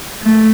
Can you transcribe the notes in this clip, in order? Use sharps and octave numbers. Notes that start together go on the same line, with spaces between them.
A3